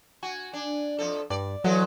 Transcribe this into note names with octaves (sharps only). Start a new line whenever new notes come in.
F#4 G#5
D4
F2 F3 A4
G2 D5
E3 F#3 G#3 A4